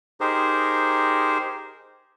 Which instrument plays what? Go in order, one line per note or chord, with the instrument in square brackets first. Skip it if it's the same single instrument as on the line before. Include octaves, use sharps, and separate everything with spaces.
[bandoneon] D#4 G4 G#4 A#4 C5